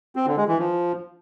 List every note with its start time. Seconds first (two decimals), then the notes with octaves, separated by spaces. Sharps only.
0.16 C4
0.26 D3
0.37 G#3
0.48 E3
0.58 F3